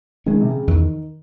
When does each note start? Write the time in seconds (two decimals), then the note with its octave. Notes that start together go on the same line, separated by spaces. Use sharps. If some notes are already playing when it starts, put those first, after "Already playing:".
0.26 D#3 G#3 C#4
0.34 C#3
0.41 C3
0.48 C#3
0.67 E2 D#3